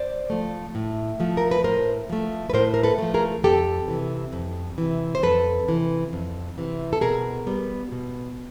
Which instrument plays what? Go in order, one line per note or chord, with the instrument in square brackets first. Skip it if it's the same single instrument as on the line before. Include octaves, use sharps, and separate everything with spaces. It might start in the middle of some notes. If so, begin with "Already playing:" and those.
Already playing: [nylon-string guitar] C5 D5
F3 A3
A2
F3 A3
A#4
B4
A2 A#4 C5
F3 A3
B4
A2 A#4 C5
A#4
A4 B4
F3 A3
G#4 A#4
F2 G4 A4
C3 E3
F2
C3 E3
C5
F2 A4 B4
C3 E3
F2
C3 E3
A4
B2 G#4 A#4
G3 B3
B2